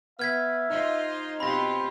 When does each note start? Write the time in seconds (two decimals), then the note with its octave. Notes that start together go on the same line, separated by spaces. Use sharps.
0.19 B3 E5 F6 G#6 B6
0.70 D#4 F4 C5 D#5
1.40 B2 C4 F4 G4 B5 A#6